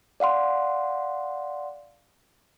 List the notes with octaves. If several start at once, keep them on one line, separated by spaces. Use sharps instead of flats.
D5 F5 F#5 C6